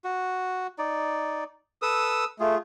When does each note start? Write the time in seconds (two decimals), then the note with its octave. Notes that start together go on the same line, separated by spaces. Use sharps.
0.04 F#4
0.78 D#4 D5
1.82 A4 B4 D#6 E6
2.40 A3 F4 G#4